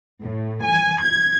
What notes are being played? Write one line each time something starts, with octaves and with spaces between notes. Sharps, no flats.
A2
G#5
G#6